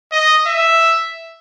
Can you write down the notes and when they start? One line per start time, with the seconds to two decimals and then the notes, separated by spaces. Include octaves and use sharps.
0.12 D#5
0.47 E5